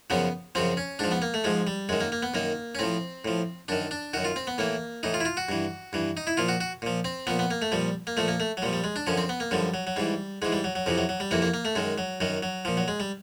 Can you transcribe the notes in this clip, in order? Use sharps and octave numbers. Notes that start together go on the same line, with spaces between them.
F#2 C#3 F3 B3
F#2 C#3 F3 C4
C#4
G#2 F3 D4
B3
A#3
A3
G#2 F3 G#3
G3
F#2 D#3 G#3
A#3
A#3
B3
F#2 D#3 A#3
C#4
A2 F3 C4
A2 F3
F#2 D#3 D4
D4
F#2 D#3 F#4
F4
C4
B3
A2 E3 A#3
A2 E3 D#4
F4
E4
F4
F#4
G2 E3
G2 E3
D#4
E4
A#2 F3 F4
F#4
F#4
A#2 F3
C4
A#2 F3 B3
B3
A#3
A3
A#2 F3 G3
A#3
A#2 F3 A3
A#3
A3
F#3
A#2 F3 G3
G3
G#3
D4
F#2 D3 F3 C#4
C4
B3
A#3
F#2 D3 F3 G3
F#3
F#3
G#2 E3 G3
G#2 E3 G#3
G3
F#3
F#3
F2 C3 E3 F3
F#3
F#3
G3
F2 C3 E3 A#3
A#3
A#3
A3
F#2 D#3 G#3
F#3
F#2 D#3 F#3
F#3
A#2 F3
F#3
G#3
G3